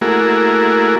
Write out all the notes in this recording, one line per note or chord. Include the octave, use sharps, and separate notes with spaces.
A3 A#3 E4 F#4 G#4 A#4